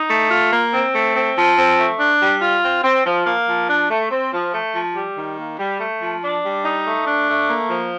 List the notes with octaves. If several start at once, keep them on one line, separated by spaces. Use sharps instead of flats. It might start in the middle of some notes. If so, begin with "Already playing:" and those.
Already playing: D#4
A3
F4
A#3
C4
A3
C4
F3
C4
A3
D4
G3
F4
C4
C4
F3
A#3
F3
D4
A3
C4
F3
A3
F3
G3
D#3
A#3
G3
A3
F3
D4
G3
D#4
A3
D4
A3
A#3
F3